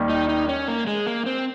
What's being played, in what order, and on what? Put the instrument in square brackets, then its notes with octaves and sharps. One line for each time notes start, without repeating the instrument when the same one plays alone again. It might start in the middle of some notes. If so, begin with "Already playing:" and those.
Already playing: [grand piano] D#2 D#3 G3
[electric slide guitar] D#4
D#4
C#4
A#3
G#3
A#3
C4